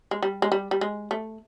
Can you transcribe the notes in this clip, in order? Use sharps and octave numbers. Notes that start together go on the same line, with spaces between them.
G#3
G3
G#3
G3
G3
G#3
A3